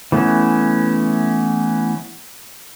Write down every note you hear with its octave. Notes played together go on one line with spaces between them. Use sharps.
E3 A3 B3 C#4